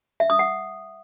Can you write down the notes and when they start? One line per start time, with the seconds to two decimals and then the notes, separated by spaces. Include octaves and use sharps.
0.20 E5
0.30 D#6
0.39 F#5